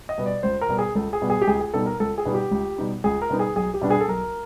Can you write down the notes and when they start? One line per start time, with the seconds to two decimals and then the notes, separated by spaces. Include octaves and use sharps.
0.09 D#5
0.18 B2 G3 B3
0.26 D5
0.43 C#2 C5
0.61 A#4
0.69 B2 G3 B3
0.79 G#4
0.95 C#2 A4
1.13 G#4
1.22 B2 G3 B3
1.30 G#4
1.42 G4
1.47 C#2 G#4
1.60 G#4
1.74 B2 G3 B3 D#4 A4
1.86 A#4
2.00 C#2 A4
2.18 G#4
2.25 B2 G3 B3 D#4
2.34 G4
2.51 C#2
2.78 B2 G3 B3 D#4
3.04 C#2 G#4
3.22 A#4
3.30 B2 G3 B3 D#4
3.39 G#4
3.56 B1 G#4
3.74 G4
3.81 B2 G3 B3 D4
3.90 G#4
4.01 A4
4.08 B1 A#4